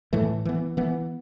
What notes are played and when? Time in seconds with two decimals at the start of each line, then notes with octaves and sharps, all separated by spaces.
0.13 A2 E3 A3
0.45 E3 B3
0.77 E3 B3